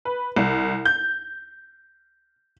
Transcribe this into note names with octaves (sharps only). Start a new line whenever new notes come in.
B4
C2
G6